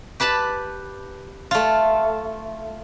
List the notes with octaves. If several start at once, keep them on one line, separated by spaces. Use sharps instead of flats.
G4 B4 A5 B5
A3 F4